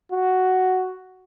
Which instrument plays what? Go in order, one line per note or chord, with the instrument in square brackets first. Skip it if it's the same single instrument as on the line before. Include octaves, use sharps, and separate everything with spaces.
[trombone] F#4